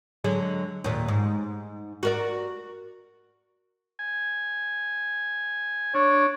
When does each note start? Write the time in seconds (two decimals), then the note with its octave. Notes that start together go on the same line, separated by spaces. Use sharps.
0.24 D3 F#3 G#3
0.84 D#2 A#2
1.08 G#2
2.03 F#4 A#4 D5
3.99 G#5
5.94 D4 C#5